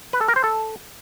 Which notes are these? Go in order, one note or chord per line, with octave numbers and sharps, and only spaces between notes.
B4
A4
A#4
C5
A4